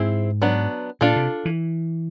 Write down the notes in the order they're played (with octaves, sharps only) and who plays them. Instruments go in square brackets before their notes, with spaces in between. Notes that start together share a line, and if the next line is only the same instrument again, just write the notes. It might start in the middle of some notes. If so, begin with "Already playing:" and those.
Already playing: [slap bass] G#2 [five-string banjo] C4 E4 G#4
[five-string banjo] F#3 B3 D4
[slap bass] A#2 [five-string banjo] D4 F4 A4
[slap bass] C3
E3